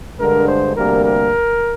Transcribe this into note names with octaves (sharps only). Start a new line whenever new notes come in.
G2 D3 G#3 A#4
C5
D2 C3 G3 A#3 A#4
A#4